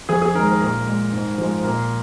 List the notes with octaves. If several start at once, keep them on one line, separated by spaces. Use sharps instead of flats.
F2 G#4
G#4
D#3 G#3 A#4
A#4
A#2 A#4
G#3
G#2
F3 G#3
A#2 A#4